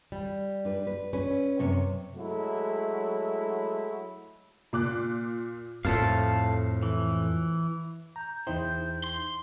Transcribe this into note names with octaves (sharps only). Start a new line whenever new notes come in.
G3
D4 B4
B4
C#4 B4
F#2 C3 C#5
F#3 G#3 A3 E4
A#2 D6 F#6
F2 A2 F5 A5
E3
A#5 G6
E2 D#4 E4 C5 G5
C6